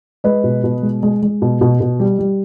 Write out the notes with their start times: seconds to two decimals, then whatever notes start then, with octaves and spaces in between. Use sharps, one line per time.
0.24 G#3 B4 D#5
0.44 B2
0.64 B2
0.82 G#3
1.03 G#3
1.23 G#3
1.42 B2
1.61 B2
1.80 B2
2.00 G3
2.19 G3